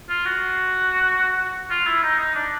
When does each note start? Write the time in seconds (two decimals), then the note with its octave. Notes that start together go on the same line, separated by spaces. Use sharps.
0.09 F4
0.25 F#4
1.71 F4
1.87 E4
2.03 D#4
2.19 D#4
2.35 D4